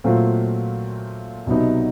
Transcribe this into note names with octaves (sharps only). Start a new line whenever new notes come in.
A#2 F#3 A3 C4 F4
C2 B2 F#3 B3 D#4